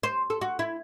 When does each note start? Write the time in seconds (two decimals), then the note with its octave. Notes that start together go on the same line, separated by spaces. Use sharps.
0.03 C5
0.30 A4
0.41 F#4
0.59 E4